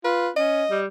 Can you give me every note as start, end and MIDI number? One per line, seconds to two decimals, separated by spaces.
0.04 0.29 65
0.04 0.29 71
0.36 0.63 61
0.36 0.79 75
0.70 0.86 55